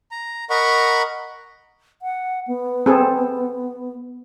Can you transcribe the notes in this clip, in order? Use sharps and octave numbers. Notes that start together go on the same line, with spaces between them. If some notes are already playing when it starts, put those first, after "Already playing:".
A#5
A#4 D#5 F#5 A#5 B5 C#6
F#5
B3
C4 G#4 A4